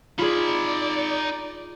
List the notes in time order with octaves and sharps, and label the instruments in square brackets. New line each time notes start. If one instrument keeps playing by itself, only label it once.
[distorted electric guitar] D#4 B5 [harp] F4 G#4 [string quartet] D5